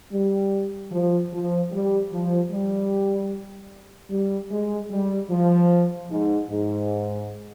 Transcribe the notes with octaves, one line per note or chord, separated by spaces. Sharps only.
G3
F3
F3
G3
F3
G3
G3
G#3
G3
F3
G#2
G#2